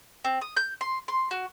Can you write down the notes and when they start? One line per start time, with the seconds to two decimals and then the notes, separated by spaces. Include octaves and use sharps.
0.24 C4
0.41 D#6
0.57 G6
0.81 C6
1.08 C6
1.31 F#4